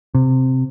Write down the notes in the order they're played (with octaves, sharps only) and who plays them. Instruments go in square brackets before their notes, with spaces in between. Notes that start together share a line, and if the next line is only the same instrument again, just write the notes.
[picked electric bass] C3